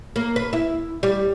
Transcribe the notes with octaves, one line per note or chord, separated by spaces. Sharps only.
A#3
B4
E4
G3